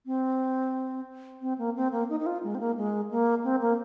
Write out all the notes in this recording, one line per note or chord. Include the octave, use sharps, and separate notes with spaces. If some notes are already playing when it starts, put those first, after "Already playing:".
C4
C4
A#3
C4
A#3
D#4
D#4
F4
G#3
C4
A#3
G#3
A#3
C4
A#3